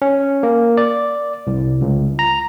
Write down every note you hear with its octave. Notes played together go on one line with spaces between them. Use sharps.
C#4
A#3
D5
C2
C#2
A#5